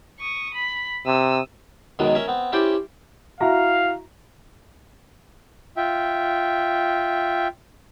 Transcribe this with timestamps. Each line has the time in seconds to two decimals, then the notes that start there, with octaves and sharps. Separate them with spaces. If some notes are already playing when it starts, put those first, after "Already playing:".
0.20 C#6 D#6
0.54 B5
1.06 C3 D#6 E6
1.99 F#2 B2 D#3 F#3 G#3 B3
2.15 C#4 A#4 E5 G#5
2.28 B3 C4
2.52 C#4 E4 G4 C5 D5 G5
3.41 E4 F#4 F5 A#5
5.77 F4 E5 G5